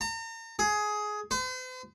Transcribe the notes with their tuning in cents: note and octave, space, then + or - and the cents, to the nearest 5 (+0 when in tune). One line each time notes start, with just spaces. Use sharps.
A#5 -40
G#4 +15
C5 -45